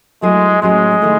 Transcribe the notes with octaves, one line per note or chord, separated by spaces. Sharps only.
F#3 G#3 A3 E4 G#4
A2 F#3 G#3 C#4 G#4
D#3 A3 E4